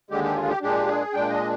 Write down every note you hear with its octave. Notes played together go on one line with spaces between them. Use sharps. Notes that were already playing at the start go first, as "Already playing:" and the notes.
D#2 D3 G#3 G4
G4
F4
G4
A#2 G#3 D4 G4
G#4
A#2 G#3 D4 G5
D#5